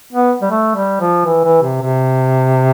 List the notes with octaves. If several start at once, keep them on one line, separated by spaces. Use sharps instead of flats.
B3
G3
A3
G3
F3
E3
E3
C3
C3